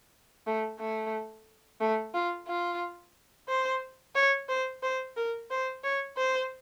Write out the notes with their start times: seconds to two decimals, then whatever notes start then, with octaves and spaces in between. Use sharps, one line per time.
0.46 A3
0.79 A3
1.80 A3
2.14 F4
2.47 F4
3.48 C5
4.15 C#5
4.49 C5
4.83 C5
5.16 A#4
5.50 C5
5.84 C#5
6.17 C5